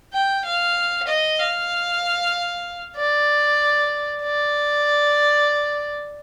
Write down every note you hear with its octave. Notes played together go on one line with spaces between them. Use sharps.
G5
F5
D#5
F5
D5
D5